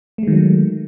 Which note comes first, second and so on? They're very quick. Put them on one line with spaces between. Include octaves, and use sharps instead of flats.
A3 G#3 D#3 F#3